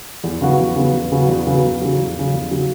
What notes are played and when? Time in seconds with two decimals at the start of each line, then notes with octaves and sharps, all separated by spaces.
0.24 E2
0.41 C#3 F#3 B3 F#4
0.59 E2
0.76 C#3 F#3 B3 F#4
0.93 E2
1.12 C#3 F#3 B3 F#4
1.28 E2
1.47 C#3 F#3 B3 F#4
1.63 E2
1.81 C#3 F#3
1.99 E2
2.16 C#3 F#3
2.34 E2
2.51 C#3 F#3